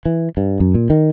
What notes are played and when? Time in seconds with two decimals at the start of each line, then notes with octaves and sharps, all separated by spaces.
0.05 E3
0.37 G2
0.60 F#2
0.75 A#2
0.90 D#3